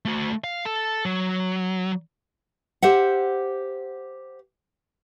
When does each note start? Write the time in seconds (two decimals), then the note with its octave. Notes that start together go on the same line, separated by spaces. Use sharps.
0.05 A3 F#4
0.44 F5
0.65 A4
1.05 F#3
2.82 G4 C5 E5 F#5